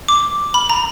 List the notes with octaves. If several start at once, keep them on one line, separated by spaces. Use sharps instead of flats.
D6
B5
A#5